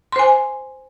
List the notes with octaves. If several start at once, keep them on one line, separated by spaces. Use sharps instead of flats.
C5 G#5 C6